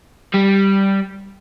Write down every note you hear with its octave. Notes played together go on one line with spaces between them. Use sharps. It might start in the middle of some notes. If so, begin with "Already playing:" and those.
G3